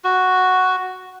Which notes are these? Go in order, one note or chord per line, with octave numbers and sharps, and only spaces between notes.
F#4